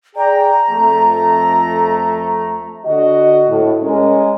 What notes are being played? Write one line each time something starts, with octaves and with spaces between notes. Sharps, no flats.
G#4 D5 G5 A#5
F2 A3
D3 F#4 D#5
A2
G#3 C#4 A#4